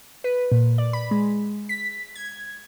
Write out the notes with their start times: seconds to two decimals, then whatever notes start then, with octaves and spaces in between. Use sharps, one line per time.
0.24 B4
0.52 A#2
0.78 D5
0.93 B5
1.11 G#3
1.69 B6
2.15 G#6